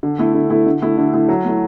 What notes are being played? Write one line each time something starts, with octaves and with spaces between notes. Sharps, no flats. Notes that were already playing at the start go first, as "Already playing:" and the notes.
D3
A3 E4
D3
A3 E4
D3
A3 E4
D3
A3 E4
F#3
A3 E4